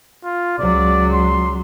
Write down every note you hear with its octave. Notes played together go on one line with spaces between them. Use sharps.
F4
C#2 F#3 D5
C6